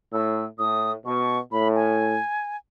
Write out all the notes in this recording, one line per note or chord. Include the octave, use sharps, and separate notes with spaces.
A2 E6
A2 D#6
B2 C#6
A2 B5
G#5